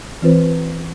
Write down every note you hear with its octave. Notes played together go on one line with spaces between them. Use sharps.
E3 C4 F4 B4 C5